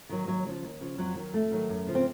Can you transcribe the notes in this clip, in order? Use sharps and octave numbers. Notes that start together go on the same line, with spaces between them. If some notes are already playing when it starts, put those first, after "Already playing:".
D#3 F#3
D#2 F#3
C#3 F3
D#2
C#3 F3
F2 F#3
D#3 F#3
F2 A3
D#3 F#3
F#2
C#3 F3
C4